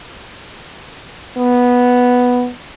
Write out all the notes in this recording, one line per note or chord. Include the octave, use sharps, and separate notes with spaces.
B3